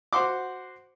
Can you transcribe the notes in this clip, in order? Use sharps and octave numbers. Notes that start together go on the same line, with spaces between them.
F#4 C5 F#5 C6 D6